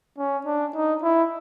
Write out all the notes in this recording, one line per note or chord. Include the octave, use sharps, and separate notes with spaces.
C#4
D4
D#4
E4